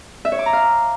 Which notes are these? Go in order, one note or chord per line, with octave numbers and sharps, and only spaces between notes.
E5
C#5
D6
A#5
F5